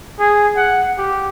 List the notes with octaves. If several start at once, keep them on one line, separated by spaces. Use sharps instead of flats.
G#4
F#5
G4